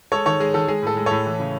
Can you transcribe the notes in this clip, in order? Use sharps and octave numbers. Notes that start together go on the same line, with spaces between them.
G#3 A4 C#5
D#3 A4 C#5
G#3 G#4
D#3 A4
G#3 G#4
A2 A4
G#3
A2 A4 C#5
E3
C#3